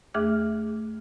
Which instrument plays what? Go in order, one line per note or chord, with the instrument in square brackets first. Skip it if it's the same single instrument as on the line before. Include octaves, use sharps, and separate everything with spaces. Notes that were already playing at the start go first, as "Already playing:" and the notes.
[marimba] E2 A3 G#4 D6 F6